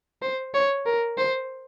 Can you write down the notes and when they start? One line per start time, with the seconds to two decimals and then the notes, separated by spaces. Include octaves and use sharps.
0.22 C5
0.54 C#5
0.86 A#4
1.18 C5